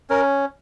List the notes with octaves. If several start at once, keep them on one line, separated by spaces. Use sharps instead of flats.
C#4 A#4